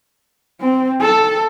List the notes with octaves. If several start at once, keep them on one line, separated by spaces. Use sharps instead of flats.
C4
A4